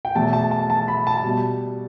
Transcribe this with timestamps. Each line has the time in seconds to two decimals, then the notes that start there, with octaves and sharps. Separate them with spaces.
0.05 G5
0.15 E2 B2 F#3 A3 A5
0.33 A5
0.51 A5
0.70 A5
0.88 B5
1.07 A5
1.24 B2 G3